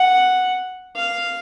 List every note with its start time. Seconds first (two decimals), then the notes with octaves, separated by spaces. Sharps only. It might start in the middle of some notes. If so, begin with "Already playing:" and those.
Already playing: F#5
0.96 F5